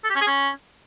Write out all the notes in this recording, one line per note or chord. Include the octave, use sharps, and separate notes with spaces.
A4
G4
C#4
G#4
C#4